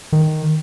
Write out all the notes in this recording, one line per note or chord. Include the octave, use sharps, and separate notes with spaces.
D#3